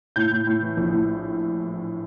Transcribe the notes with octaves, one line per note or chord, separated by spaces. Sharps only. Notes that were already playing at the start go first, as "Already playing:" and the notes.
A2 G6
A2
A2
E3
A#1
A2